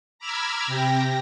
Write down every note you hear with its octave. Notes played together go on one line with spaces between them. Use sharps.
A#5 B5 D6 E6 F6 G#6
C3 G4 G5 A#6